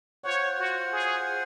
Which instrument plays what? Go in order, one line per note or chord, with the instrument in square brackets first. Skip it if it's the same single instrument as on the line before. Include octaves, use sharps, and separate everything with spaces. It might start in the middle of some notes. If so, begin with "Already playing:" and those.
[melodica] F4 C5 F#5 [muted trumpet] C#5
[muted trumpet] F#4
G#4